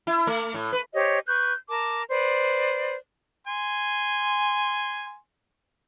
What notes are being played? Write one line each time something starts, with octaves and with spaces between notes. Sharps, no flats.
E4
A3
A2
B4
G4 C5 C#5 D#5
B4 C#6 F#6 G6
A#4 A5 D6
B4 C5 D5
G#5 C6